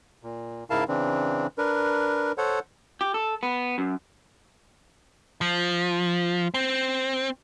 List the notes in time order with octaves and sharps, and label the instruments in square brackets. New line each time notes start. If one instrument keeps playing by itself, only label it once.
[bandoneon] A#2
G#2 C#3 E4 A#4 F5 A5
C#3 E3 C4 D4
D4 A#4 B4
A4 C5 C#5 F#5
[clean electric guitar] G4
A4
B3
F#2
[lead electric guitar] F3
C4